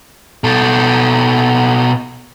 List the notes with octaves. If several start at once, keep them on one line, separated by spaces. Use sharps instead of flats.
B2 A4